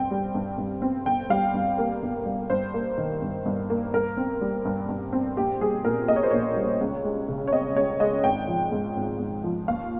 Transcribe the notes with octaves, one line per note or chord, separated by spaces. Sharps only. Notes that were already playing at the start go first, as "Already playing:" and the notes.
Already playing: G2 C4 G5
G3
G2
G2
C4
G1 G5
G3 F5
G2
A#3
G1
G3
G2 C5
A#3
D#3
G2
G2
A#3
G2 A#4
C4
G3
G2
G2
C4
A#1 G4
G3 G#4
A#2 A#4
A#3 D#5
C#5
C5
A#1 C#5
G3
C#2
G#3
C#3
C#5
C4 D#5
C#2 C#5
G#3 D#5
G#1 G5
F3
G#2
G#1
G#1
F3
D#2 F5